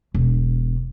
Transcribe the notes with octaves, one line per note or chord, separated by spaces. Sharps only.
E1 D3